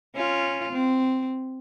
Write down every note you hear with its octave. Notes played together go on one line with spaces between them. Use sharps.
C#4 F4
C4